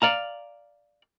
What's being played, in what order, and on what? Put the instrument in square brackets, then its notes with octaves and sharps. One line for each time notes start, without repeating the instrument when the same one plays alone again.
[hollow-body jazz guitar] D5 F5 A#5